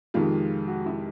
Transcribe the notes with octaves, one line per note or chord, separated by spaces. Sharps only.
F2 C3 D#3 G#3 F4
F#4
E4